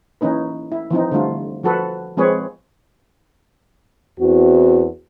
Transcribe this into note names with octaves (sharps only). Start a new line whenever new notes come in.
E3 A#3 C#4 D#4 B4
E4
E3 F3 C4 D#4
D3 G3 A3 F4
F3 F#4 A4 B4
F3 G#3 C4 G#4 B4 C#5
E2 C4 E4 F#4